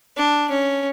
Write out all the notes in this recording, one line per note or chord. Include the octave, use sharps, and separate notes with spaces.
D4
C#4